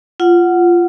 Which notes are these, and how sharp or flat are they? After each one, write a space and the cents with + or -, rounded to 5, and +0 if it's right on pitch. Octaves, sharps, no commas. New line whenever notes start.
F4 -15 F#5 +0